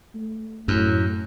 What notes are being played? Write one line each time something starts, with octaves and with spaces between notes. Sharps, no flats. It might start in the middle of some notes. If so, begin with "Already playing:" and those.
A3
F#2 A2